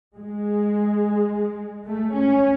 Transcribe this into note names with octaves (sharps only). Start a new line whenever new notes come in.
G#3
A3
C#4